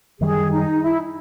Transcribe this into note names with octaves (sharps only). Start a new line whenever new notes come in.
F#2 D#3 G3 G#4
D#4
E4